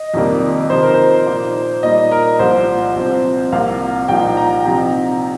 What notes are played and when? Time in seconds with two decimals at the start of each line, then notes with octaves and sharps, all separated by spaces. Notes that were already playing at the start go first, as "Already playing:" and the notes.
Already playing: D#5
0.14 F2 C3 D#3 G3 A#3
0.70 C3 F3 D#4 C5
0.82 A#4
0.94 C5
1.26 A#2 A#3 D#4
1.83 A#2 G3 D#4 D#5
2.11 A#4
2.39 C2 A#2 F3 C5
2.96 C2 C3 F3 C4
3.52 C2 C3 F3 A#3 F5
4.08 C2 A#2 F3 D#4 G5
4.37 A#5
4.65 C3 F3 D#4